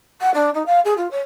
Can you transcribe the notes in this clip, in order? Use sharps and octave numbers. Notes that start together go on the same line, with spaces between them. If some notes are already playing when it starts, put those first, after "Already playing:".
F#5
D4
D#4
F5
G#4
F4
C#5